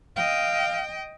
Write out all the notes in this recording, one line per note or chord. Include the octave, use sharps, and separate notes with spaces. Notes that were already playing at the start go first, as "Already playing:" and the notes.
D#5 F5 G5